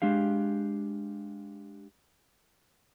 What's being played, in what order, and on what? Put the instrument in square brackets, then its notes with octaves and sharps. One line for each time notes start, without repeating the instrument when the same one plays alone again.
[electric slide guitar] G#3 D4 G4 F5